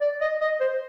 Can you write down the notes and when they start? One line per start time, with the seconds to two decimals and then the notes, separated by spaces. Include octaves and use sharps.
0.01 D5
0.21 D#5
0.41 D#5
0.61 C5